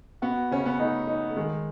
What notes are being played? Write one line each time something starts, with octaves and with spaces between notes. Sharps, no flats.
B3 F#4
C#3 C#4
B3
A3 D#4
D#4
A3
D#3 G#3